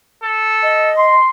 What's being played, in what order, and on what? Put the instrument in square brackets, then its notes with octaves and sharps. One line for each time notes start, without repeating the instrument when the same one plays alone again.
[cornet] A4
[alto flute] D#5
[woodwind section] C6